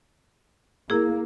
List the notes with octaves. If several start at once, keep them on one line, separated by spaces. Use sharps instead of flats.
A#3 E4 G#4